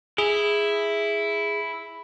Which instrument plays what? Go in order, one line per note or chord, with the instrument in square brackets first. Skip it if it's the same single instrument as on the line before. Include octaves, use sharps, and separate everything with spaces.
[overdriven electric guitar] E4 [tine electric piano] G#4